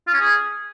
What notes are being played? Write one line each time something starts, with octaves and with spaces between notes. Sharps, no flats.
F4
C#4
G#4